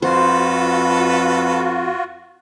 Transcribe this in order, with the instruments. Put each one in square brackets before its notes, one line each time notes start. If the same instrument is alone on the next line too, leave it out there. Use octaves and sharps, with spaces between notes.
[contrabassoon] F2 [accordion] F4 F#4 [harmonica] A4 B4 [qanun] C5